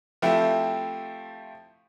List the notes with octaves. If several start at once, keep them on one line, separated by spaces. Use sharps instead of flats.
F3 A3 C4 E4 G4